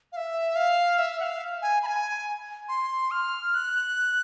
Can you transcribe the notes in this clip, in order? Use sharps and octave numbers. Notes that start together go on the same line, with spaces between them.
F5
E5
F5
E5
F#5
F5
G#5
B5
G#5
C6
F6
F#6